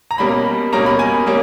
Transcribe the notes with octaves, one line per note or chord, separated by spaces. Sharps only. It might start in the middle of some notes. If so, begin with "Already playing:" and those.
A#5
B2 G3 A#3 C#4 B5
B2 G3 A#3 C#4 A#5
B5
G#5
B2 G3 A#3 C#4